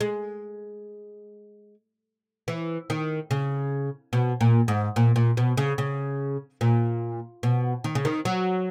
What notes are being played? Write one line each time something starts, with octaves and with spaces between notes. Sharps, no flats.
G#3
E3
D#3
C#3
B2
A#2
G#2
A#2
A#2
B2
C#3
C#3
A#2
B2
D#3
C#3
D#3
F#3